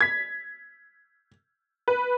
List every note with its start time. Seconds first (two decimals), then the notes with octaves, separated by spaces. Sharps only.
0.01 G#6 B6
1.88 B4